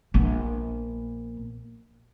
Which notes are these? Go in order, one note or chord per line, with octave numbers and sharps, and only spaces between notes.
A#1 B3